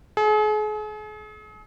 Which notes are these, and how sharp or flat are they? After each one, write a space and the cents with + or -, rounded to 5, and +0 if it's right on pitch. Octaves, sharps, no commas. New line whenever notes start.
G#4 +40